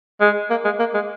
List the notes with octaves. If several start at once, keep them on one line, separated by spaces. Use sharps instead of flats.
G#3
A#3
G#3
A#3
G#3